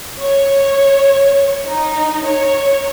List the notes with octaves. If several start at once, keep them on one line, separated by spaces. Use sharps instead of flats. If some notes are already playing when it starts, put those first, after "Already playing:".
C#5
D#4
C#5